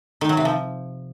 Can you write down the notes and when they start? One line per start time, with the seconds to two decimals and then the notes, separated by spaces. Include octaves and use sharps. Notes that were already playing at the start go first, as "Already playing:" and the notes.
0.21 D#3
0.29 F#3
0.37 C3
0.45 F3